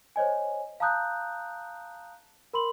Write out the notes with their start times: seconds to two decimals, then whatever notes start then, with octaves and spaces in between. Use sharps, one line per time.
0.16 C5 C#5 D#5 G#5
0.80 F5 A5 A#5 D#6 F#6 G6
2.54 A#4 B5 C6 F#7